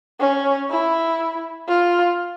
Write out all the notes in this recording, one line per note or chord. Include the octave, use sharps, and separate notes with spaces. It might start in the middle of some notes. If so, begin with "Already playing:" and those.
C#4
E4
F4